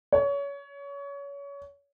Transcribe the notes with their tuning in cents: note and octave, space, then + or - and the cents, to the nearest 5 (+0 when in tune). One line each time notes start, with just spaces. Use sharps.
C#5 +25